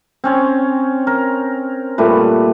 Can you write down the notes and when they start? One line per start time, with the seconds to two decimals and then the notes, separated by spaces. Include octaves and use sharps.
0.24 C4 C#4 C#5
1.07 A#4
1.98 A#2 G3 A3 B4